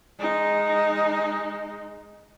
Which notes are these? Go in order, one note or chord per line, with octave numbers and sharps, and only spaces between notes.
G#3 D#4